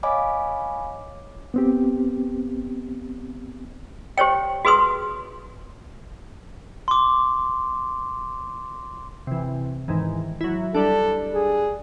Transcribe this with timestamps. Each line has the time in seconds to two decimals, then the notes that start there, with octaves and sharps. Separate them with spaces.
0.03 C#5 D#5 F5 G#5 B5 D6
1.54 B3 C4 G4
4.18 G4 C5 C#5 G5
4.65 F#4 G#4 B4 C6 D#6
6.88 C6 D6
9.27 C3 E3
9.88 G#2 D#3 E3
10.41 F#3 E4
10.74 G3 D4 A4
11.33 G#4